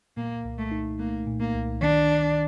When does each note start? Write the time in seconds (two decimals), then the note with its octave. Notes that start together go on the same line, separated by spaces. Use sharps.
0.17 A#2 A#3
0.45 C2
0.58 A3
0.71 D#4
0.99 A3 A#3
1.27 A#2
1.40 A#3
1.54 C2
1.81 D#3 D4